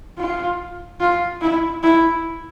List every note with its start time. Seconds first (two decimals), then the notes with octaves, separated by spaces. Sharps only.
0.18 F4
1.00 F4
1.41 E4
1.83 E4